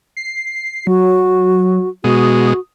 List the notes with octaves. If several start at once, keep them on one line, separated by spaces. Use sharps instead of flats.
C7
F#3 F#4
B2 G#3 F#4 D#6